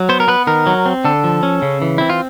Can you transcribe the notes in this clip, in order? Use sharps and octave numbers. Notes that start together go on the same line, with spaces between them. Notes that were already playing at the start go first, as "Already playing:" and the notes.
Already playing: F#3
B3 C5
A#4
B3 B4
D#3 A#4
F#3
C4
D3 A4
F3
C#4
C#3
E3
C4 E4
F4